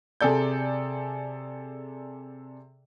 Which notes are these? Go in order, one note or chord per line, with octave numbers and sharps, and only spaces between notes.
C3 G#4 A4 D5 G6